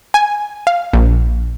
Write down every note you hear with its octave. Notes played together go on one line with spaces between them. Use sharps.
G#5
F5
A#1